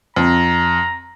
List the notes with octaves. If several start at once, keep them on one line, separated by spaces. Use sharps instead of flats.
F2 A#5